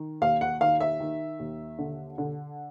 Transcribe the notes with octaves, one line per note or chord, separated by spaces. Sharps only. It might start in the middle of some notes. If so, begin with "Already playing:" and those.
Already playing: D#3
D#2 F5
F#5
D#3 F5
E5
D#3
D#2
D3
D3